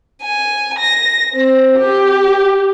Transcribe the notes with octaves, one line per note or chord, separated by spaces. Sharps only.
G#5
A#6
C4
G4